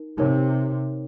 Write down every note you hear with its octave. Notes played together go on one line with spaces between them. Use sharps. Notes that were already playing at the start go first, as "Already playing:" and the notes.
Already playing: D#4 A#4
C3 D#4 A#4 C#5